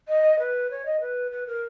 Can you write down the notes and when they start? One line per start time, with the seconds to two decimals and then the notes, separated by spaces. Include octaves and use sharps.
0.08 D#5
0.39 B4
0.70 C#5
0.85 D#5
1.00 B4
1.31 B4
1.46 A#4